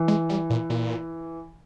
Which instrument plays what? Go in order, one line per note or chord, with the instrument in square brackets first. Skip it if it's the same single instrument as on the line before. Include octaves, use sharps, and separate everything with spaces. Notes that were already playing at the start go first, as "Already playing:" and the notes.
Already playing: [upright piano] E3
[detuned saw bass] G#3
G3
A#2
A#2